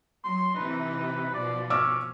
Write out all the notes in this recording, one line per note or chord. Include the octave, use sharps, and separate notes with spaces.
F#3 C6
C3 E3 D#4 B4
B2 F3 D5
C#4 D6 E6 F6